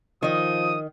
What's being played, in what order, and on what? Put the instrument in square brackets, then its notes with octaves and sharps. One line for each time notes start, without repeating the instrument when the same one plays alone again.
[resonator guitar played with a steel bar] D#3 D#5 [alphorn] F3 [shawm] D#6